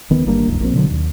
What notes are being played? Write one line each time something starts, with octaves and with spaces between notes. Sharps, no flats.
D#1 D#3 B3
G1 G3 A#3 D4
D1 C2 F#2
A#1 A#3 C4
B2 D3 F#3
D#2